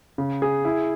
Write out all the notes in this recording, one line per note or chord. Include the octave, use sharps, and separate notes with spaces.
C#3
G#4
E4